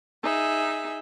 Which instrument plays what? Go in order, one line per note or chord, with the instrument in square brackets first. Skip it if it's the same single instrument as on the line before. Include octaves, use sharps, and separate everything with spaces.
[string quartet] D#4 G#4 E5